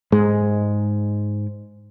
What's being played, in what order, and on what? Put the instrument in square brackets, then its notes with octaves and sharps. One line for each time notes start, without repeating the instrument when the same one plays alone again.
[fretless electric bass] G#2 G#3